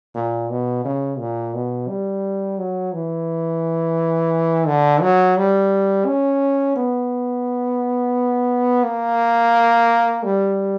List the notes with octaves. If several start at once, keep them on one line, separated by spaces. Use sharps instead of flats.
A#2
B2
C#3
A#2
B2
G3
F#3
E3
D3
F#3
G3
C#4
B3
A#3
G3